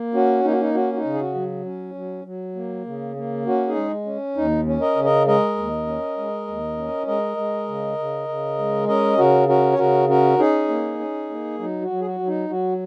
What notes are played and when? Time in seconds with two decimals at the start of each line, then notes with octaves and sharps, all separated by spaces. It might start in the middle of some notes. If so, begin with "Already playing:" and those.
Already playing: A#3
0.14 C#4 F#4
0.44 A#3 D#4
0.52 F#4
0.60 D#4
0.74 C#4 F#4
0.93 F#4
0.97 D#4
1.04 C#3
1.14 G#4
1.20 F#4
1.35 F#3
1.66 C#4
1.95 F#3
2.25 F#3
2.56 A#3
2.86 C#3
3.16 A#3
3.46 C#4 F#4
3.68 D#4 G#4
3.76 G#3
4.06 C#4
4.37 D#2 D#4
4.66 C#4
4.81 A#4 D#5
4.96 C#3
5.04 A#4 D#5
5.27 G#3 A#4 D#5
5.57 D#2
5.87 C#4
6.17 G#3
6.48 D#2
6.77 C#4
7.07 G#3 A#4 D#5
7.37 G#3
7.68 C#3
7.98 C#3
8.29 C#3
8.58 G#3
8.88 C#4 A#4 D#5
9.18 C#3 F#4 A#4
9.48 C#4 F#4 A#4
9.72 C#5
9.78 C#3 F#4 A#4
10.09 C#4 F#4 A#4
10.39 C#4 D#4 G#4
10.69 A#3
11.00 C#4
11.30 A#3
11.59 F#3 D#4
11.82 F#4
11.90 F#3
12.01 G#4
12.04 F#4
12.20 F#3
12.28 D#4
12.50 F#3 F#4